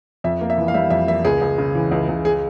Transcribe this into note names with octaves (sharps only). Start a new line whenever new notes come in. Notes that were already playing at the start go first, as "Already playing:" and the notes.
F2 E5
A#3
E5
E3
F5
G3 E5
F2 E5
A#3 E5
C#2 G#4
C#2
C#3
E3
C#2
C#2
G#4